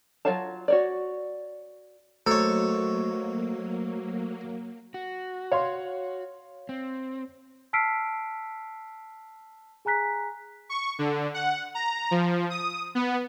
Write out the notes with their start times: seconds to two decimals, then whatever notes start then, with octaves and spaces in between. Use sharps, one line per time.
0.25 F#3 F4 C#5 F5 A5
0.68 F#4 C#5 D5
2.26 F#3 A3 A#3 F#4 A4 C5 C#5
4.94 F#4
5.52 C#5 F5 C6
6.69 C4
7.73 A5 E6 F6 B6 C7 D7
9.85 G#4 G#5 A#5 F#6 B6
10.69 C#6
10.99 D3
11.34 F#5
11.75 A#5
12.11 F3
12.50 D#6
12.95 B3